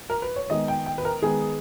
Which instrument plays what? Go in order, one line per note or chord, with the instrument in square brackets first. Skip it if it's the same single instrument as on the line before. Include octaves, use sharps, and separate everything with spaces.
[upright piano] A#4
B4
C#5
D#3 G#3 B3 D#4 D#5
G5
G5
B4
A#4
D#3 G#3 B3 D#4 G#4